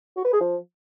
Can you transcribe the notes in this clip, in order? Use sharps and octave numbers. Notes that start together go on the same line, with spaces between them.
F#4
B4
G#4
F3